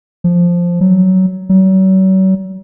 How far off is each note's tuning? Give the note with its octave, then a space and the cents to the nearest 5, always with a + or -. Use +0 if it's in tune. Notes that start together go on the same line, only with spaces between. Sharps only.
F3 +0
F#3 +15
F#3 +40